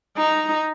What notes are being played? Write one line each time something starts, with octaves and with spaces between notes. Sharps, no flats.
D#4